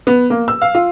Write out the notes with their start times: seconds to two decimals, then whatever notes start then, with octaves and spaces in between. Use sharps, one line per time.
0.07 B3
0.30 A#3
0.48 E6
0.62 F5
0.75 F4